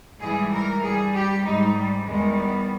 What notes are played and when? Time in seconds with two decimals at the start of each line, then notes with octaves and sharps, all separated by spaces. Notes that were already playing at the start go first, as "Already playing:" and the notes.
0.20 G#2 E3 G3 G#4
0.52 A#4
0.82 G2 G3 G#4
1.13 G4
1.43 G#2 G3 D#4
1.74 G3
2.05 E2 D#3 G3 G#3
2.36 B3